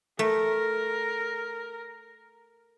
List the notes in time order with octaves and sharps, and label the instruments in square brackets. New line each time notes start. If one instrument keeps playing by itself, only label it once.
[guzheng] A3 [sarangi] A#4